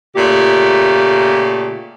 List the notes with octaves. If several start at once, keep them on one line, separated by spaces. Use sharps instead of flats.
A#2 C#3 A3 G4